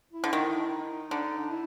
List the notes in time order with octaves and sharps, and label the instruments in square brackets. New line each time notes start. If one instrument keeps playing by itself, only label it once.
[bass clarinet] E4
[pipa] D3
D#3
[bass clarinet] D#4
[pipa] D3
[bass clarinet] E4